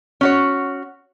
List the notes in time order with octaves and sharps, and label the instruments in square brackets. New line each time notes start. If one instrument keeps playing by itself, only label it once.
[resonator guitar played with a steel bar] C#4 F#4 C#5